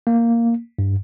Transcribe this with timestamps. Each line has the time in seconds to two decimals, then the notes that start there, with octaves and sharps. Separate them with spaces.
0.07 A#3
0.79 G2